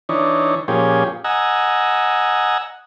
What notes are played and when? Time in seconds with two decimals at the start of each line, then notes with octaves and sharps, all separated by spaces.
0.09 E3 D4 D#4 C#5
0.68 A#2 F3 C#4 G4 G#4
1.24 D#5 F#5 G#5 A#5 E6